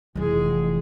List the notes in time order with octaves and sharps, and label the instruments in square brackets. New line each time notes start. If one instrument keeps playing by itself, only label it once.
[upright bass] F1 E3 [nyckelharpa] G#3 G#4